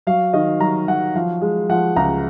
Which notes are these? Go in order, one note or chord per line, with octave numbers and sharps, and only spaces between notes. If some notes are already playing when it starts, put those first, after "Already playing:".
F#3 F5
D#3 D#5
F#3 A#5
F#3 F#5
F3 F5
G#3
F3 F#5
C#2 A#5